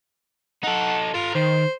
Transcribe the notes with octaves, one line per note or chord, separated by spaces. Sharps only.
D#4 A4 F#5
F4 A4 A#5
D#3 C5